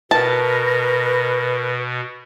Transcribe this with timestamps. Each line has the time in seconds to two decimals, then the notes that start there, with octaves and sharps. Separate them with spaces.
0.11 B2 A#4 B4 A5